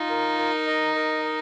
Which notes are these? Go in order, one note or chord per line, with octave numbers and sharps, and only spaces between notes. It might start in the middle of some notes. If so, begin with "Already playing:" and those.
Already playing: D#4 F4
A#4
A#4
D#5
A#4
D#5